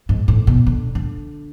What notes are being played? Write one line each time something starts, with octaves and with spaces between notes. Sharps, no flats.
G#2
A2
B2
D3
D3